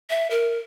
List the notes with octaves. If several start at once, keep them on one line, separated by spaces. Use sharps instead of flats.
E5
A#4